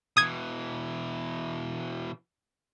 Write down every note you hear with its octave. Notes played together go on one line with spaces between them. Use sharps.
B2 E3 D#6 G#6